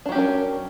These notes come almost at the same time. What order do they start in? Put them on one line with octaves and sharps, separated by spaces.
D4 F#3 G4 C#4 A#4